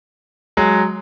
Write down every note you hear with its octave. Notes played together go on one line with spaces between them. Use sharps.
F#3 G#3